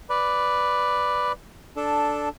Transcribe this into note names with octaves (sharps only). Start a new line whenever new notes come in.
B4 D5
D4 A4